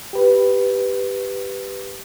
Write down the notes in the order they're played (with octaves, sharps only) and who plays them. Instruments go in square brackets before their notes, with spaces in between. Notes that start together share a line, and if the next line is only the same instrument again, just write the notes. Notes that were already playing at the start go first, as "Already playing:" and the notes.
[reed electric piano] G4 B4